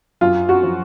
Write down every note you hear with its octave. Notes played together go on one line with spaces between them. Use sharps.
F#2 F4
F#4
F3